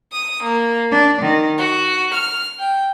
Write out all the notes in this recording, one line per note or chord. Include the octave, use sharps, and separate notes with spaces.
D#6
A#3
D4
D#3
F#4
F6
G5